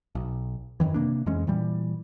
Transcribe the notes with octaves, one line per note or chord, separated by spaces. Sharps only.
B1
F#2 C3 D#3 E3
C3 A#3 D4
F2 E3 G#3 C#4
A#2 E3 G3